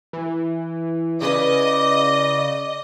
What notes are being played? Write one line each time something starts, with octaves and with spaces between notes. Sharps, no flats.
E3
C#3 E4 G#4 B4 D5 D#5